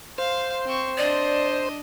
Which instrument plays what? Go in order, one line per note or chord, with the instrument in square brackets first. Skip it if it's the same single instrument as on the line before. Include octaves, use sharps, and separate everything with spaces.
[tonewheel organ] C5 [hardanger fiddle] F5
[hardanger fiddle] C4 C#6
[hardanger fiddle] D4 D#5 [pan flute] D5